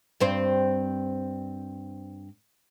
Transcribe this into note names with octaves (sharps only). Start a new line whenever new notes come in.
G2 C4 C5